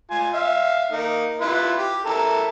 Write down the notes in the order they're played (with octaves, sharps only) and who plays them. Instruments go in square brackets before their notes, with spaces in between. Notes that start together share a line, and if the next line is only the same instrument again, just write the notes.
[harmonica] F4 G#5
E5 F5
A#3 D#4
E4 F4 B4
G4
E4 A4 A#4